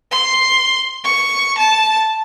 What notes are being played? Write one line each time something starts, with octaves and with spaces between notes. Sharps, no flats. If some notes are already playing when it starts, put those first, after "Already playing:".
C6
C#6
A5